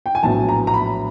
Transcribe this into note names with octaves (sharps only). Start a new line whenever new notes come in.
G5
G#5
A#1 A2 F#3 B3 A5
A#5
A#5
B5